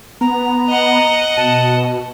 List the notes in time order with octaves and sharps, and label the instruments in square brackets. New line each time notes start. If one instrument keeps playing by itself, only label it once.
[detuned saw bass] B3 [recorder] A#5
[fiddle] D#5 F#5
[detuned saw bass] B2 [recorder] A5